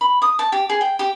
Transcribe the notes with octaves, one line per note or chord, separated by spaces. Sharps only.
B5
D#6
A5
G4
G#4
G5
G4